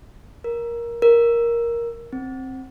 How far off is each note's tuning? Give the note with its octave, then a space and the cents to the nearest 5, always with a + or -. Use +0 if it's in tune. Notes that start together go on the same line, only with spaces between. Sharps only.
A#4 +10
A#4 +5
C4 +10